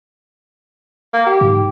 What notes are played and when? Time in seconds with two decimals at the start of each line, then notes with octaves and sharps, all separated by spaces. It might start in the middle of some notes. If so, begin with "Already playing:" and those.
1.14 A#3
1.26 G4
1.41 G#2